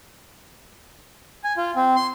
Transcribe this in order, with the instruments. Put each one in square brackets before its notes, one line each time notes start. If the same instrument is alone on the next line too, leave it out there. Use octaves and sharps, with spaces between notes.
[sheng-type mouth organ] G#5
F4
C4
C6